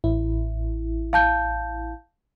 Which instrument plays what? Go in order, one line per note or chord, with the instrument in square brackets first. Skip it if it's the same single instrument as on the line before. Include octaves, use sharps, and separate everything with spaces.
[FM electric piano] A1 E4
[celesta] F5 A5 G6